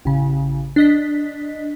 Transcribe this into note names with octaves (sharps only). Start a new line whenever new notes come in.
A1 C#3
D4 D#5 B6